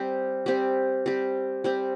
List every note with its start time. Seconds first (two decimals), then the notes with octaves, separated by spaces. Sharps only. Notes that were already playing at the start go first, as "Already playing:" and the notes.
Already playing: G3 C4 G4
0.46 G3 C4 G4
1.06 G3 C4 G4
1.64 G3 C4 G4